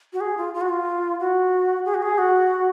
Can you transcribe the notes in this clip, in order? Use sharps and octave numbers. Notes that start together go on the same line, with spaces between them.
F#4
G#4
F4
F4
F#4
F4
F#4
G#4
F#4
G#4
F#4